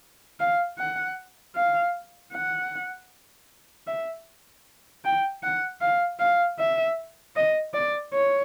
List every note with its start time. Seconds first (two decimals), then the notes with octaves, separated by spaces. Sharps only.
0.40 F5
0.78 F#5
1.56 F5
2.34 F#5
3.87 E5
5.04 G5
5.43 F#5
5.81 F5
6.20 F5
6.59 E5
7.36 D#5
7.74 D5
8.13 C#5